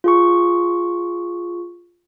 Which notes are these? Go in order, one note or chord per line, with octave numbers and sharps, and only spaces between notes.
F4 G#4 C#6